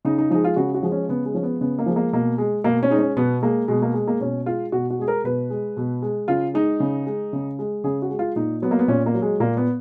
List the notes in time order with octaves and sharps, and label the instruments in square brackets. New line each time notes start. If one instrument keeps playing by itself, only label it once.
[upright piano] C#3 D#4
D#4
F3 G#3 D#4
F4
C#3 F#4
F#4
F3 G#3
C#4
C#3 B3
G#3
F3 C#4
G#3 B3
C#3 B3
A#3
F3 G#3
A#3
B2 A#3
G#3
B2 A#3
C#4
G#3 D#4
C#4
B2 B3
G#3 A#3
B2 G#3
A#3
G#3
A#3
B2 C#4
G#3 F4
B2 F#4
F#4
G#3 G#4
A#4
B2 B4
G#3
B2
G#3
C#3 F4
G#3 D#4
C#3
G#3
C#3
G#3
C#3 G#4
F#4
G#3
F4
A#2 D#4
F#3 B3
A#3
B3
A#2 C#4
A#3
F#3
G#3
A#2 A#3
B3